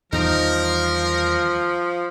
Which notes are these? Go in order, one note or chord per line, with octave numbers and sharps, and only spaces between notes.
E2 D#3 F3 G3 D#4 A#4 A#5 D6